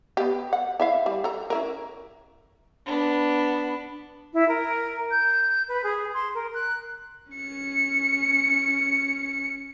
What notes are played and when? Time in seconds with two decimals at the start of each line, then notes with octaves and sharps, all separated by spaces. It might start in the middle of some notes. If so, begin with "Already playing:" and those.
0.17 B3 G4
0.53 F#5
0.80 E4 E5 F5
1.06 G3
1.24 A4 A#5
1.50 C#4 E4 A#4
2.86 B3 D4
4.33 E4
4.48 A#4
5.11 G6
5.68 B4
5.84 G#4
6.14 C6
6.35 A#4
6.54 F#6
7.33 C#4 C#7